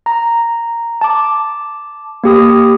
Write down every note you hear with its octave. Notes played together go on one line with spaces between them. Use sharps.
A#5
A5 D6
A#3 G4 D#6